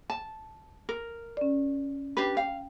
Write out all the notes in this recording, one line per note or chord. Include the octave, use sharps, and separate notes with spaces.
A5
A#4
C#4 D5
D4 G4 B4
F5 G5